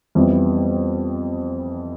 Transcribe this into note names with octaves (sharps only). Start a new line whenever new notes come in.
F2 E3 G3 B3